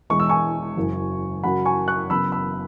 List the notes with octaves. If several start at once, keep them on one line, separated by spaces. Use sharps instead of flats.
E1 E2 E3 G#3 C#6
E6
G#5 C#6
F#1 F#2 E3
F#2 C#3 F#3 F#5 B5
G#5 C#6
C#6 F#6
F#1 F#2 C#3 F#3 B3 B5 E6
B5 E6